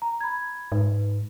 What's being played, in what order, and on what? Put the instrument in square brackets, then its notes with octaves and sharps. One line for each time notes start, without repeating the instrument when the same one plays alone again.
[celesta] A#5
B5 G#6
[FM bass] G#2 [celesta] D#4 B4